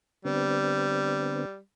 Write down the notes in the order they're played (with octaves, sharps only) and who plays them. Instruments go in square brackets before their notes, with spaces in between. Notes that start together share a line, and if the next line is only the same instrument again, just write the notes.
[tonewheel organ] D3 B3 C4 [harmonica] G3